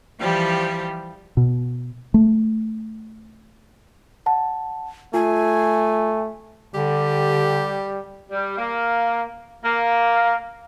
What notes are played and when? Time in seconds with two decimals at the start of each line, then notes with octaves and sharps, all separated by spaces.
0.21 E3 F3 G3 G4
1.37 B2
2.14 A3
4.26 F#5 A5
5.14 A3 F4 G#5
6.74 D3 G3 G4
8.31 G3
8.58 A#3
9.63 A#3